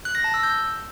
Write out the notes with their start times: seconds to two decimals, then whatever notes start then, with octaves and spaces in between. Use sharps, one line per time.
0.05 F#6
0.15 A#6
0.24 A5
0.34 E6
0.43 G6